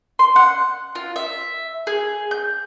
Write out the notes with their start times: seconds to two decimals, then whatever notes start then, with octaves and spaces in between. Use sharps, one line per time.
0.19 C6
0.36 F#5
0.95 F4
1.16 E5
1.87 G#4
2.31 G6